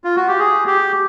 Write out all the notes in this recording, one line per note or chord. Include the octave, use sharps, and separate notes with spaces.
F4
F#4
G4
G#4
G4